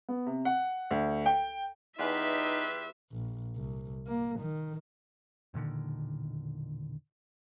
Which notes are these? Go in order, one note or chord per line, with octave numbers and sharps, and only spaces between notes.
B3
C3
F#5
D2
G5
E2 D#4 F4 G4 B4 E5
A#1
C2
A#3
D#3
E1 A#2 D3 D#3